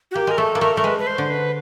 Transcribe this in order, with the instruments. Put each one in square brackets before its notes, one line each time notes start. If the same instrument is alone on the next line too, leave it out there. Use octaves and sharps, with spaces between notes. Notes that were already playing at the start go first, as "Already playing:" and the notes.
[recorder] F#4
[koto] A#3 [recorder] G4
[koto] G#3 [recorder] A#4
[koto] A3 [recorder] A4
[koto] A#3
[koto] A3 [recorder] A#4
[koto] A3 [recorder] A#4
[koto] G#3 [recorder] B4
[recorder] B4
C5
[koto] D3
[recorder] B4